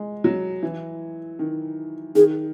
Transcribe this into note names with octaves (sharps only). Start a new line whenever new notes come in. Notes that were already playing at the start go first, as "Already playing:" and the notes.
Already playing: G#3
F#3
E3
D#3
D#3 G#4